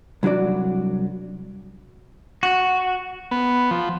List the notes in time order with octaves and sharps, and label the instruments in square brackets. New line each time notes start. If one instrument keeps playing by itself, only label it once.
[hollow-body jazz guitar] C2 F#3 D4 F#4 D5
[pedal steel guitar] F#4
[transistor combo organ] B3
F3